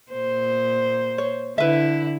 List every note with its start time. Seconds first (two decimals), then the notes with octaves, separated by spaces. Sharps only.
0.12 A#2 C5
1.18 C#5
1.58 D3 E4 B4 E5